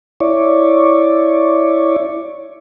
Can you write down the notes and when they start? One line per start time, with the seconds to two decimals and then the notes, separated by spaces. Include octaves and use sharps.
0.20 E4 C#5 D5